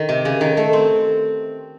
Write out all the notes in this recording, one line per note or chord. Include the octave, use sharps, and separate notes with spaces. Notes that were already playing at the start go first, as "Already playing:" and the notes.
Already playing: D#3
C3
C#3
D#3
A3
C4